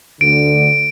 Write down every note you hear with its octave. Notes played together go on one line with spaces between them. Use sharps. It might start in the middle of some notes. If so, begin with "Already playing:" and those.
D2 D3 D7